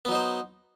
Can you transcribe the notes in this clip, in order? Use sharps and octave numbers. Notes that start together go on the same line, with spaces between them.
F#3 B3 D#4 C5